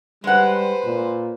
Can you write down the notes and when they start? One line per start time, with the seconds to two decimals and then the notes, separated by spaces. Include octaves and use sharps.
0.24 G3 G#3 B4 C5 F#5
0.85 A#2